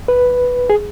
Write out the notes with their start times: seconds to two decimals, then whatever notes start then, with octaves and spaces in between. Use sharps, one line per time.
0.08 B4
0.70 G#4